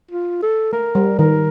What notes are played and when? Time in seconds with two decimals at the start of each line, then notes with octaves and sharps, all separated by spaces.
0.11 F4
0.43 A4
0.73 A3 A#4
0.95 G3
1.19 D#3 A#4